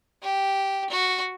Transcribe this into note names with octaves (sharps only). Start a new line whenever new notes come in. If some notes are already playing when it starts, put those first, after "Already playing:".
G4
F#4